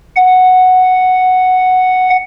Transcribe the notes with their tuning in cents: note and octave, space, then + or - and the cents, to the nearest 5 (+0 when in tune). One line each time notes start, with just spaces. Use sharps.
F#5 +0